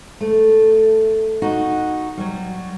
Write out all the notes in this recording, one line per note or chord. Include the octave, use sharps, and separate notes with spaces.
A3
D#4 F#4
F#3 G3